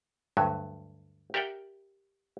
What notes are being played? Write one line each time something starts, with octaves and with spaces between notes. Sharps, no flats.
D2 G2 F#3
G4 A#4 D5 E5 F#5 G5